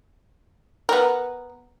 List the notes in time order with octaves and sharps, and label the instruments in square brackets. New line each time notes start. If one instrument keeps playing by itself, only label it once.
[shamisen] B3 A#4